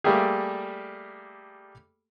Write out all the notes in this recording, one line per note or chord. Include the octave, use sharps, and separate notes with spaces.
G3 A3 A#3 G4 G#4